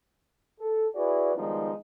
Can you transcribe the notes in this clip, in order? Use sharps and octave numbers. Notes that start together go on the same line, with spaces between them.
A4
E4 F#4 G#4 B4 D5
D#3 F3 G3 G#3 B3 D#4